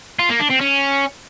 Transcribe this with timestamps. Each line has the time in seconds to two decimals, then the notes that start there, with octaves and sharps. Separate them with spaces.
0.19 F4
0.30 A#3
0.40 D4
0.51 C4
0.61 C#4